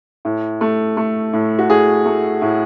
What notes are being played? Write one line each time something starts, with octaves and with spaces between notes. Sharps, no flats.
A2
A3
A3
A2
F#4
A2 G#4
A3
A2